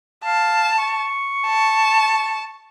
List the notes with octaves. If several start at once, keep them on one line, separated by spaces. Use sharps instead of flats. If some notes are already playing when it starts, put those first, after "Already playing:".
F5 A5
C#6
A5